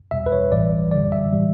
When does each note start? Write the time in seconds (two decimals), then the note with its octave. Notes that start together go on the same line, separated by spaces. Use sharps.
0.11 E2 B2 G3 E5
0.26 B4
0.32 C#5
0.52 A1 A2 E3 G3 D5
0.92 F#2 D3 G3 D5
1.12 E5
1.33 A2 E3 G3